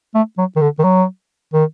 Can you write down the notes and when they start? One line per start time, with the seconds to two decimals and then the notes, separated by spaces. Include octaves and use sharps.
0.15 A3
0.38 F#3
0.56 D#3
0.61 D3
0.79 D#3
0.84 F#3
1.53 D#3